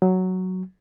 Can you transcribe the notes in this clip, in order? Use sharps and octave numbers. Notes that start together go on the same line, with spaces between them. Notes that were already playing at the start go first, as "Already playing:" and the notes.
F#3